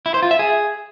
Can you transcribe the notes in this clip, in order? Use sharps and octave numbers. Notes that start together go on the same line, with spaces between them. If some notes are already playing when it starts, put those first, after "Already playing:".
E4
C5
F4
E5
G#4